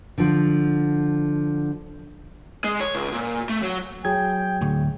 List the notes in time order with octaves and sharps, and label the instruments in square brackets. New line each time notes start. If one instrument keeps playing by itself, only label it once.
[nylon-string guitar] D3 F3
[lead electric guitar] G#3
C#5
C#2
A#2
A3
F#3
[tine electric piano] F#3 G#4 G#6 [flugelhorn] G5
[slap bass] D2 A2 D3